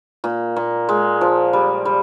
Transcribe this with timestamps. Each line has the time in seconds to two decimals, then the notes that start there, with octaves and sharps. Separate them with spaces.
0.24 A#2
0.56 A#2
0.89 G#3
1.21 F3
1.53 G3
1.85 G3